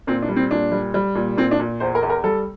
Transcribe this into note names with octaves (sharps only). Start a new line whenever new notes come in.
A#2 C4
D4
G3
C4
A#2 D4
G3
G3
A#2
A#2 C4
D4
A#2
E2 C5
A#4
E2
A#4
G3 A4